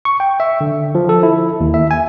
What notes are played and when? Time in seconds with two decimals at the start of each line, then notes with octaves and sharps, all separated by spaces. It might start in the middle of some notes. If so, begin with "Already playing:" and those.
0.05 C#6
0.20 G5
0.40 E5
0.61 D3
0.95 F3
1.09 A4
1.23 E4
1.61 D#2
1.74 E5
1.91 G#5